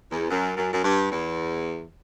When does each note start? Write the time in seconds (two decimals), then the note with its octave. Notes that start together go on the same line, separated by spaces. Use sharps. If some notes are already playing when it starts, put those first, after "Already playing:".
0.12 E2
0.31 F#2
0.57 F#2
0.73 F#2
0.84 G2
1.12 E2